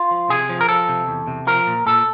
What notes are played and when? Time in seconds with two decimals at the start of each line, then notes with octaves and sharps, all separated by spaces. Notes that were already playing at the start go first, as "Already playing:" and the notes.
Already playing: F4
0.11 F3
0.30 C3 G#4
0.49 F3
0.61 A#4
0.69 F3 A4
0.89 C3
1.07 E2
1.27 C3
1.47 F3 A#4
1.67 A#2
1.86 A#2 A4